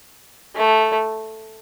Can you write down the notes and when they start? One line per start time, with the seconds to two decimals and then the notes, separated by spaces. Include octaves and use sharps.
0.56 A3